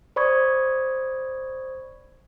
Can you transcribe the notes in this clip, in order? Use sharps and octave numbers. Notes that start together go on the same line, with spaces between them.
C5 D5 B5 C#6 D#6 G#6